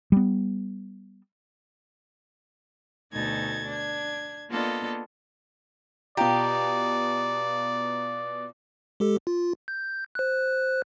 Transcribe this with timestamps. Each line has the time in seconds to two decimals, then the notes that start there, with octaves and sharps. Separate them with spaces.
0.12 G3 B3
3.14 D2 B2 D#4 A4 G#6 A6
3.67 D4 G#6
4.50 A#3 B3 D4 F4 A4 D#5
6.17 B2 F4 G4 D5 A#5
9.00 G#3 G4 A4
9.27 F4
9.68 G6
10.15 C5 F#6